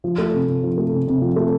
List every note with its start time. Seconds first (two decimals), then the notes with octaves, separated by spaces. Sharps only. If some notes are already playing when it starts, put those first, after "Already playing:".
0.04 F3
0.18 A3
0.33 C3
0.48 C3
0.63 F3
0.78 A3
0.93 C3
1.08 C3
1.21 F3
1.36 A3